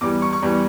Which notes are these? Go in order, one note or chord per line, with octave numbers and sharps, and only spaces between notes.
E2 E3 G3 D6
C#6
C#6
E2 E3 G3